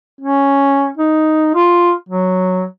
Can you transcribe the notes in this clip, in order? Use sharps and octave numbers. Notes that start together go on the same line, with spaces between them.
C#4
D#4
F4
F#3